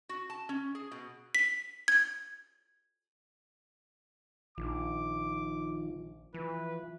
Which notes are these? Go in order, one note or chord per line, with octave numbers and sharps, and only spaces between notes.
F#4
A5
C#4
G#4
B2
B6
G#6
A#1 D#3 F3 D6
E3 F3 B4